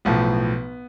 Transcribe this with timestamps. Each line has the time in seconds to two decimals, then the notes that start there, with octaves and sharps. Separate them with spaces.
0.05 B1 A2 F3 B3